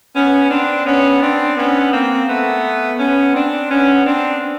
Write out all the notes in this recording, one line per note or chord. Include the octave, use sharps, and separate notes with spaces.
B3 C#4
C4 D4
B3 C#4
C4 D4
B3 C#4
A#3 C4
A3 B3
B3 C#4
C4 D4
B3 C#4
C4 D4